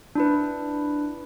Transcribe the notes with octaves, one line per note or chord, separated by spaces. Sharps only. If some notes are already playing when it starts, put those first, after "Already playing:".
D4 E4 B4